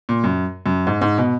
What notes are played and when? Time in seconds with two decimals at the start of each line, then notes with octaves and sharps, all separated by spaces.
0.09 A#2
0.24 F#2
0.66 F#2
0.87 G#2
1.01 G#2
1.18 B2